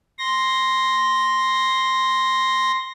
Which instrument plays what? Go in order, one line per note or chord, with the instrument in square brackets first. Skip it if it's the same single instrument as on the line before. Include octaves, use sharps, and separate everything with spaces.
[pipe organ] C6 A#6